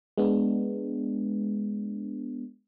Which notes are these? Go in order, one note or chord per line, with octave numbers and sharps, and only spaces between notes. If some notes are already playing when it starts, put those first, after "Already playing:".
G#3 B3 D4